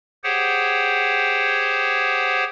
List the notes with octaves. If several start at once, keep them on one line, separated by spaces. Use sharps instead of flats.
G4 G#4 C5 C#5 F#5 G5